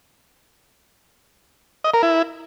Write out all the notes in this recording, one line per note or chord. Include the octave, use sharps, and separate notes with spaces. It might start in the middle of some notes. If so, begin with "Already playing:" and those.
D#5
A#4
E4